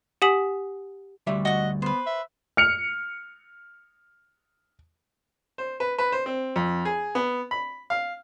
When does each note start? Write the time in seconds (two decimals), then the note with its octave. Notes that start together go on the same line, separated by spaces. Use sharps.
0.22 G4 F#5 G#5 D#6 B6 F#7
1.27 D2 G3 E5
1.45 F#4 D#5 F#5
1.82 B3 B4 C5
2.06 E5
2.57 F6 C#7 F7
5.58 C5
5.80 B4
5.98 B4
6.12 C5
6.26 C4
6.56 F2
6.85 G#4
7.15 B3
7.51 B5
7.90 F5